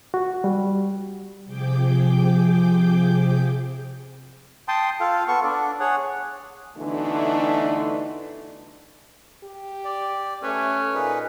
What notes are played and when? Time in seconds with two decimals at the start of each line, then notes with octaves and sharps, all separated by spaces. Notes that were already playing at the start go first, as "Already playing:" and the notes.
0.14 F#4
0.44 G3
1.46 C3 F3 G#4 G5 D6 G6
4.68 G5 A5 C6 D#6
5.00 F4 A4 F5
5.28 B3 A4 C#6
5.44 D4 D5
5.80 G#4 C#5 F#5
6.77 B2 D3 E3 A3 D4 D#4
9.43 G4
9.85 D5
10.43 A3 C#4 B4
10.94 A#2 D#4 G#4 B4